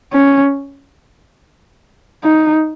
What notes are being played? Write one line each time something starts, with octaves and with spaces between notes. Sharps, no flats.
C#4
D#4